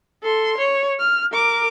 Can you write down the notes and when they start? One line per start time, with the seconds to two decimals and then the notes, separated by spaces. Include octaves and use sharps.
0.22 A4 C6
0.57 C#5
0.99 F6
1.32 A#4 D6